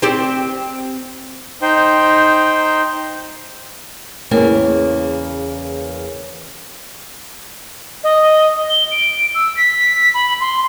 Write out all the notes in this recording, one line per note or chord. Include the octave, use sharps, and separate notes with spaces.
C4 G4 D5
D#4 C5 G5
E2 C#3 A#3 G#5
D#5
G7
D7
E6
B6
B5
C6